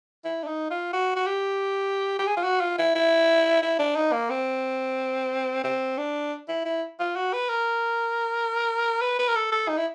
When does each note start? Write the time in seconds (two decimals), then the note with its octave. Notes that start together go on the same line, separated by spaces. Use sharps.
0.25 E4
0.43 D4
0.47 D#4
0.71 F4
0.93 F#4
1.16 F#4
1.27 G4
2.19 G4
2.27 G#4
2.37 F4
2.44 F#4
2.61 F4
2.78 E4
2.95 E4
3.62 E4
3.79 D4
3.96 D#4
4.12 A#3
4.30 C4
5.64 C4
5.98 D4
6.48 E4
6.65 E4
6.99 F4
7.16 F#4
7.33 B4
7.49 A#4
9.01 B4
9.19 B4
9.28 A#4
9.36 A4
9.52 A4
9.69 D#4
9.77 E4